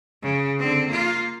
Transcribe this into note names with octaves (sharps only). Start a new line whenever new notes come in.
C#3
D3 C4
A#3 F4